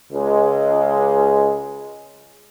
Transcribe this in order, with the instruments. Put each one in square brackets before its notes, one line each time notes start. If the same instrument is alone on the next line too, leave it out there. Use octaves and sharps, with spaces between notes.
[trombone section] C#2 G#3